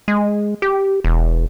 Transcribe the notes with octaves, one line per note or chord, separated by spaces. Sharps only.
G#3
G4
E1